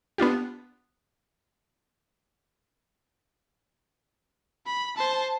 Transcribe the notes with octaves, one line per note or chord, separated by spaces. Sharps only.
B3 D4 F4 G4
B5
C5 A5